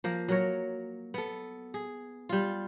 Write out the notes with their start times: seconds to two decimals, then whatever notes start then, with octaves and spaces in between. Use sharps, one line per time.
0.04 F3 A#3
0.28 F#3 A#4 C#5
1.14 B3 A4
1.74 G#4
2.29 G3 F4